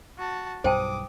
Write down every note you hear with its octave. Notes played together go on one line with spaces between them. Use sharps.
F#4 A5
B1 G2 C5 G5 A5 D6 D#6